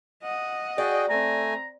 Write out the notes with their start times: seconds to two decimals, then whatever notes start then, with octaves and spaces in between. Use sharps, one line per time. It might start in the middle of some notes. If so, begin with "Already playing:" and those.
0.23 D#5 F#5
0.78 F#4 G#4 D5 G5
1.10 A3 C4 G#5 A#5